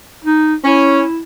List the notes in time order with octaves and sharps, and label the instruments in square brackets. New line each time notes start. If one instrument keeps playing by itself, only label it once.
[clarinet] D#4
[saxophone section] C#4 [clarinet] E4